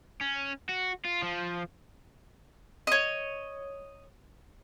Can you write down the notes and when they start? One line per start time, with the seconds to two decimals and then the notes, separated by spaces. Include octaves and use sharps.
0.21 C#4
0.69 F#4
1.05 F4
1.23 F3
2.87 C#5 D#5